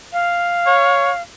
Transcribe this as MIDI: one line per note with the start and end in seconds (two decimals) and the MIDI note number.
0.13 1.22 77
0.67 1.11 73